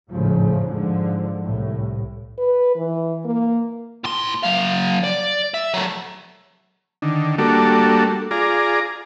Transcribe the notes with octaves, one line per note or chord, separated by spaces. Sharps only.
G#1 F2 A2 C#3 F3
G#2 D3 F3
C2 A2
B4
E3
A#3
A2 C6
F#3 F5
D5
E5
F#3 A3
D3 D#3
G3 A3 A#3 D4 F#4 A4
F4 G#4 D5 A#5